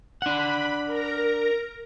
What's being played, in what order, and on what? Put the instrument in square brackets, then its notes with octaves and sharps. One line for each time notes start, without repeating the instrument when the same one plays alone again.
[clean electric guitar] D4 F#5 [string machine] B5
[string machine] A#4 A#5